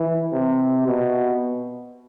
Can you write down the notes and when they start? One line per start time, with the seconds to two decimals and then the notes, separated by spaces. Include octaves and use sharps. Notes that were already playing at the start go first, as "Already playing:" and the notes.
Already playing: E3
0.32 C3
0.86 B2